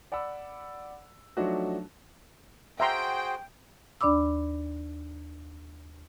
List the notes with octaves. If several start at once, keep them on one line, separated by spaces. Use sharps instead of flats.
D5 F#5 B5 E6
F3 F#3 A3 D4 D#4 F#4
F#4 G#4 C5 E5 G5 A#5 C6
D#2 D4 D5 B5 D6 E6